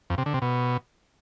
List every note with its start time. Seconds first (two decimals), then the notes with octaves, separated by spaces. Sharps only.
0.10 F2
0.18 C3
0.26 D3
0.34 C3
0.42 B2